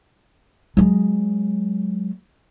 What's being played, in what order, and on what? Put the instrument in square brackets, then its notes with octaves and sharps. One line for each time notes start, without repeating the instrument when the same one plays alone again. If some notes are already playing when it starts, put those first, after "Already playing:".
[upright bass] F#3 G#3